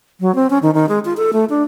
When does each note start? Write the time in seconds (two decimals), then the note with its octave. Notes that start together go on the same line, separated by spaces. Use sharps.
0.20 F#3
0.35 C4
0.50 C#4
0.62 D#3
0.74 D#3
0.89 G#3
1.05 F4
1.17 A4
1.33 A3
1.50 D4